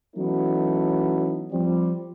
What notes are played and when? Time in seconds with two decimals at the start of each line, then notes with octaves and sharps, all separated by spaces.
0.16 E3 F#3 A3 B3 C#4 D#4
1.52 F3 G3 C4